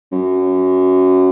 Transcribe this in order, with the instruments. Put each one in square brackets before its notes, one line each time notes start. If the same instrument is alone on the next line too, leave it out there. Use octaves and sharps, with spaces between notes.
[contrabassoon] F#2